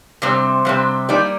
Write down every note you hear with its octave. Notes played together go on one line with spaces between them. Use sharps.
C3 G3 C4
C3 G3 C4
G3 A#3 D#4 G4 D5